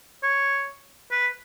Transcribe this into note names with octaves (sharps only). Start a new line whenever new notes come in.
C#5
B4